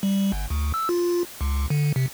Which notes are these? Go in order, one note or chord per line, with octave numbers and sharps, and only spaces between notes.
G3
G1
D2
E6
F4
C#2
D3
C3